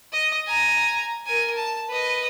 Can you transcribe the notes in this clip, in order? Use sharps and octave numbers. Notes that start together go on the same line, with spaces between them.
D#5
G#5 A#5
A#4 G#5
A5
B4 D#5